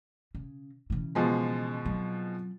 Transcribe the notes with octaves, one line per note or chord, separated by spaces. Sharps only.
C#3
C#3 E3
B2 F3 G#3
F#3 C4